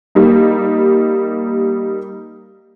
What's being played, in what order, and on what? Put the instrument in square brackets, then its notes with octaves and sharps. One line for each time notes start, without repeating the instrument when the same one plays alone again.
[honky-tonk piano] G3 A#3 D#4